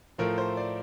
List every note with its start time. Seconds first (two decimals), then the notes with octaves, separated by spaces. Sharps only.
0.18 A2 F3 A3 A#4
0.38 C5
0.57 D5